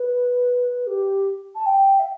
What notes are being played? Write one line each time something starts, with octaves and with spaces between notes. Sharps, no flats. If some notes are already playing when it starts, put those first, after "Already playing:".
Already playing: B4
G4
A5
G5
E5